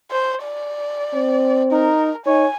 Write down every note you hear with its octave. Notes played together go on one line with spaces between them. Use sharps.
C5
D5
C4
D#4 A#4
D#4 C#5 G#5